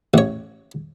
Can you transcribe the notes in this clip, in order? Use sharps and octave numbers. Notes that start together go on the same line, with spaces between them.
A1 C#5